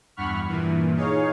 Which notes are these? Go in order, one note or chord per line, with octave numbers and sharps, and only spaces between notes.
E2 G2 F#5 B5 C#6 F6
G2 A#2 E3
D#4 G#4 C#5 F5